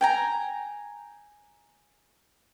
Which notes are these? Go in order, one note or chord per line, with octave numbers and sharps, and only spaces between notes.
G5 G#5 A#5